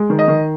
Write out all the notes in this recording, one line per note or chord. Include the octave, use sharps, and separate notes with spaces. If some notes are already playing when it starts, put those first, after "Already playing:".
Already playing: G#3
D#3
D#5
D#3